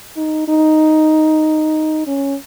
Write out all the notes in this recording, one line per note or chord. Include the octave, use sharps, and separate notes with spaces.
D#4
D#4
C#4